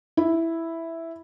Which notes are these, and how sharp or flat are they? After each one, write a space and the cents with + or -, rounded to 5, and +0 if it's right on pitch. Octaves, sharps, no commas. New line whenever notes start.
E4 +0